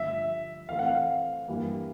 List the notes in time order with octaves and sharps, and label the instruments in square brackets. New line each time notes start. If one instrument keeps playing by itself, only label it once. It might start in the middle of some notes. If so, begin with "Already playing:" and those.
Already playing: [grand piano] G2 D3 F3 A3 [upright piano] E5
[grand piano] E3 A3 C4 [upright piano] F5
[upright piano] F#5
F5
[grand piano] G2 E3 G3 A#3